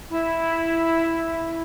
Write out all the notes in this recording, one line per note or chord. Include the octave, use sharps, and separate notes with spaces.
E4